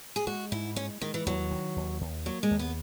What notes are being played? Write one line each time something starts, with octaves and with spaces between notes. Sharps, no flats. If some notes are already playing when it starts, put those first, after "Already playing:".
G#4
G#3 F#4
G#2 E4
G#3 C#4
D#3 G#3
E3
D#2 F#3
D#3
D#2
D#2
F#3 A#3
G#3
D#2
B3